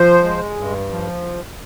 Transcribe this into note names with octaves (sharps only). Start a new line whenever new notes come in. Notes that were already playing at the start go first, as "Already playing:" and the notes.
Already playing: F3 C5
G#3
G2
F3